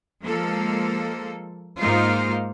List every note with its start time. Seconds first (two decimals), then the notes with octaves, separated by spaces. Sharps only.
0.23 F3 G#3 A#3 A4
1.80 G#2 A#3 D#4 F4 C5 F5